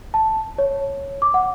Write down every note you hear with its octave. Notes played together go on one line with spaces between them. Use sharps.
A5
C#5
D6
F#5